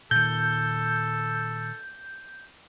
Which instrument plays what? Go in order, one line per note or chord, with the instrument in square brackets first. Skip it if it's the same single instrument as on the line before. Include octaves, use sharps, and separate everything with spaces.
[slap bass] A#2 D#3 [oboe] A4 [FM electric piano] G6